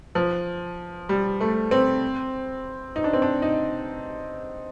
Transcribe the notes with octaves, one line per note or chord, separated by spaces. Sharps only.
F3
G3
A3
C4
D#4
D4
C4
D4
D#4